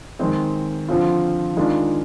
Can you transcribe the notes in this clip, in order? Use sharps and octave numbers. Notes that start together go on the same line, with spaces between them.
D#3 G#3 C4
D3 F3 C4 F4
D#3 G#3 D4 F4